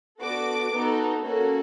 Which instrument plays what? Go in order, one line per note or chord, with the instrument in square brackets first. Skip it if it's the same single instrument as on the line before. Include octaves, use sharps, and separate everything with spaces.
[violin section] B3 D4 F#4 A4 D6
B3 D#4 F#4 A4
A#3 C#4 F#4 A4